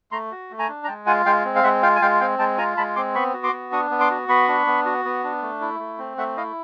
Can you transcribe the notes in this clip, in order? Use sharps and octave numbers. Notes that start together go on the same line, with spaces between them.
A3 A#5 C6
F#4
A3
G#5 A#5
D4
A#5
G#3 G5 A5
F4 F#5 G#5
G#3 F5 G5
C4
F5
G#3 E5 F#5
F4 F5 G5
G#5
G#3 F5 G5
C4 F5 G5
G#3 G5 A5
F4 G#5 A#5
G#3 A5 B5
C4 C6 D6
B3 B5 C#6
F#4
C6 D6
B3
D4 C#6 D#6
B3
C6 D6
F#4
B3 B5 C#6
D4
B3
F#4
B3
D4
A3
E4
A3
C4
A3 E5 F#5
E4 D#5 F5